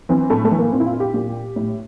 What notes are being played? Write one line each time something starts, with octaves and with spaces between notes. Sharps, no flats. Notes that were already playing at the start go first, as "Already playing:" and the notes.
E3 C4
A2 A3
A3
E3
A#3
A#2 C4
E4
F4
G4
A#2 G4
A2